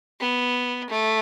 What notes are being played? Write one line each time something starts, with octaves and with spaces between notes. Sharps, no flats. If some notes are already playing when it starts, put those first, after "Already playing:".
B3
A3